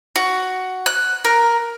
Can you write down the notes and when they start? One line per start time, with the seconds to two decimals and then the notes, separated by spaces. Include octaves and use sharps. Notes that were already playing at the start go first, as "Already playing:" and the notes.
0.16 F#4
0.86 F#6
1.25 A#4